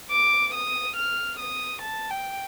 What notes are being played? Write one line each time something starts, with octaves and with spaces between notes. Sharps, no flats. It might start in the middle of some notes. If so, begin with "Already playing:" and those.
D6
D#6
F6
D#6
A5
G5